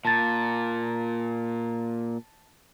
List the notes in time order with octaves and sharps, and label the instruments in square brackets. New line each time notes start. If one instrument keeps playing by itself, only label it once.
[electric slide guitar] A#2 [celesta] A5 A6